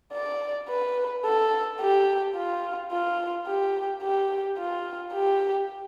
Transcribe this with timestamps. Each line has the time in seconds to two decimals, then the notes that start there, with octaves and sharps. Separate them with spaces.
0.13 D5
0.69 B4
1.25 A4
1.81 G4
2.36 F4
2.92 F4
3.48 G4
4.03 G4
4.58 F4
5.14 G4